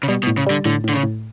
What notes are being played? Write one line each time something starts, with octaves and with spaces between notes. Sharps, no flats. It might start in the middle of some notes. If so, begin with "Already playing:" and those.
C#3
B2 G3
B2
A2
C#3
D3 G3
A2 D3
A2 D3
C#3
A2